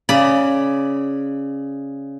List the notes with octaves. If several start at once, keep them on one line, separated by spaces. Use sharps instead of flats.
C#3 D5 B5